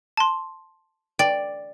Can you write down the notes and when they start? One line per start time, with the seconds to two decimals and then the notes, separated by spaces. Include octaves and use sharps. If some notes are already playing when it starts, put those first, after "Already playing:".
0.17 A5 C6
1.19 D5 G5